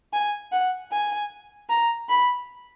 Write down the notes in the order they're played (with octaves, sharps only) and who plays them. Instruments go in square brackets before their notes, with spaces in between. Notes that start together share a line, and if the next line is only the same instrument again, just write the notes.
[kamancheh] G#5
F#5
G#5
A#5
B5